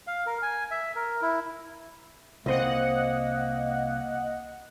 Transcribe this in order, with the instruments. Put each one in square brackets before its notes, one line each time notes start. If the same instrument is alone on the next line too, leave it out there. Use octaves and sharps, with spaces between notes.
[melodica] F5
A#4
G#5
E5
A#4
E4
[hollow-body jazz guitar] C2 C4 [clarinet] A#3 [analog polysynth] D#5 F#5